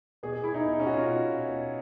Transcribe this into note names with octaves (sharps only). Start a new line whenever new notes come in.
B2 G#4
G#4
E4
D#4
B2
C#4
F#4
F4
B2
B2